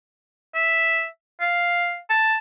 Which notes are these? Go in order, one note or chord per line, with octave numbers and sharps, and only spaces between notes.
E5
F5
A5